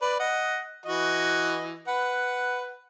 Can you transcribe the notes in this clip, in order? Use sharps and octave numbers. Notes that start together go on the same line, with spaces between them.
B4 D5
D#5 F#5
E3 F#4 D#5
B4 F#5